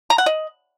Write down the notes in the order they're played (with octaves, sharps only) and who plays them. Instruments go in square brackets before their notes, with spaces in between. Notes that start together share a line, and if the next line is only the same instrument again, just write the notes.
[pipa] A#5
F#5
D#5